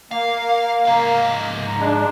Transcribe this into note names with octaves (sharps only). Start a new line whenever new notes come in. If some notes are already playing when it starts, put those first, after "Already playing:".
A#3 F5
G#2 F5 A#5
G#3 D4